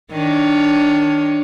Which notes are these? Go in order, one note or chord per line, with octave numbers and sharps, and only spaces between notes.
D#3 D4 C#5